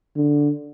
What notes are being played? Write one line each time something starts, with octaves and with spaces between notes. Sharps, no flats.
D3